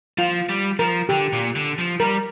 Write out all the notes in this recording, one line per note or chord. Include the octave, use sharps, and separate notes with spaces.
F3 F4
G3
F3 A#4
D3 G4
A#2
D3
F3
G3 A#4